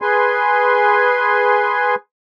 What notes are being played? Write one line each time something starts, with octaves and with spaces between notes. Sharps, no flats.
G#4 B4 G#5 C6